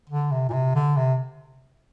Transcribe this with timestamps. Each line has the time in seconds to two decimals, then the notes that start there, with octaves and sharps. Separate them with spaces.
0.09 D3
0.32 C3
0.49 A#2
0.53 C3
0.75 D3
0.96 C3